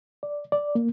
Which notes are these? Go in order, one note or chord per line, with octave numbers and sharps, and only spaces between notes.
D5
D5
A#3